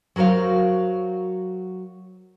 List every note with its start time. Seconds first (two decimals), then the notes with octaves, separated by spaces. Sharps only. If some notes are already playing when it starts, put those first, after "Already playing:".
0.16 F#3 F#4 A#4 C5 F5